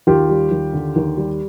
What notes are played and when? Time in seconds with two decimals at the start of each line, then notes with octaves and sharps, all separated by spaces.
0.07 D#2 F4 G4
0.29 G3
0.51 D#2
0.73 D3
0.96 D#2
1.17 G3